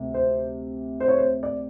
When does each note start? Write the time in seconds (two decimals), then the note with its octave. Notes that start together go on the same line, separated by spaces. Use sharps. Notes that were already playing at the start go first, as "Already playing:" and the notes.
Already playing: D2 C3
0.14 C5
1.00 C5
1.08 C#5
1.18 C5
1.43 D5